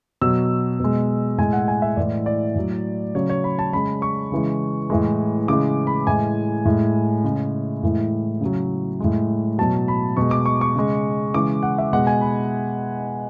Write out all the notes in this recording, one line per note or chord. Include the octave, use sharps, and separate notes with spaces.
B2 F#3 E6
B2 G#3
A2 G#3 G#5
F#5
G#5
E5
A2 E3 G#3 D5
D5
A2 F#3
C#3 F#3 C#5
C#5
B5
A5
C#3 G#3 B5
C#6
C#3 E3 G#3
A2 E3 G#3
C#3 E3 G#3 D6
B5
A2 E3 G#3 G#5
A2 G#3
C#3 G#3
A2 E3 G#3
C#3 F#3
A2 G#3
B2 F#3 A5
B5
B2 G#3 C#6
D6
C#6
C#6
C#3 G#3
C#3 E3 G#3 D6
F#5
E5
B2 G#3 F#5
G#5
B5